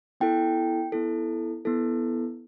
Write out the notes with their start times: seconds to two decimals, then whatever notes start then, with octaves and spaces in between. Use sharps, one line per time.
0.20 B3 E4 A4 G5
0.92 B3 E4 A4
1.65 B3 E4 A4